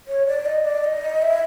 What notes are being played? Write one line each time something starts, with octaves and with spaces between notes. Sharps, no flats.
C#5
D5
D#5
D5
D#5
E5